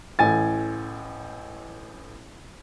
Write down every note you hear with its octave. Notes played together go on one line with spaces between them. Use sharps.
A1 A2 G#5 A6